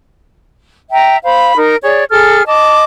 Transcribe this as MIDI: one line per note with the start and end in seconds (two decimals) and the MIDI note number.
0.92 1.17 76
0.92 1.17 79
0.92 1.17 82
1.23 1.55 72
1.23 1.55 77
1.23 1.55 83
1.56 1.76 63
1.56 1.76 70
1.83 2.04 68
1.83 2.04 73
1.83 2.04 74
2.10 2.42 68
2.10 2.42 69
2.10 2.42 89
2.46 2.83 75
2.46 2.83 81
2.46 2.83 86